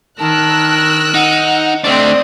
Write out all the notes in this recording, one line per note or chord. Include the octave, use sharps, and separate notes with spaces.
D#3 A#4 A5 E6 F#6
D#4 F#5
A3 C4 D4 C5 D5 D#6